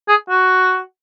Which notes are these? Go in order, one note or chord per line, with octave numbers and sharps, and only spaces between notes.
G#4
F#4